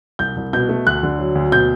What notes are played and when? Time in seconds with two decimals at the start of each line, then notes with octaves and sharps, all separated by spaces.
0.19 C2 G6
0.36 C2
0.53 B2 G6
0.69 A3
0.87 D2 F#6
1.03 D3
1.19 F#3
1.35 D2
1.52 B2 G6